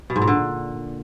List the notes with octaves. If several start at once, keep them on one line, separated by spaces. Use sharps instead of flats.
B2
G#2
A#2
D3